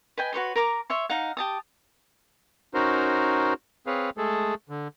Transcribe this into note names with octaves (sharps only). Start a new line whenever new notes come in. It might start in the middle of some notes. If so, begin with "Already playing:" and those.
B4 D#5 G5 G#5
F#4 B4 C#5 C6
A#4 A#5 D6
C#5 E5 C6
D#4 F5 F#5
G4 A5 D#6
C#4 D#4 F#4 A#4 C5
C4 G#4 B4 C#5 F5
G#3 A3 G#4 A4
D3